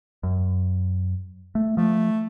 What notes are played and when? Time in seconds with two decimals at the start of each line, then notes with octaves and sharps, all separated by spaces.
0.23 F#2
1.55 A3
1.77 F3 A3